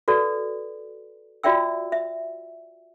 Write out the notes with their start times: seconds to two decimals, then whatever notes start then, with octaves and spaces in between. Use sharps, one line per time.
0.08 F#4 A4 B4 D5
1.44 F4 F#4 D5 E5 G5 E6
1.92 E5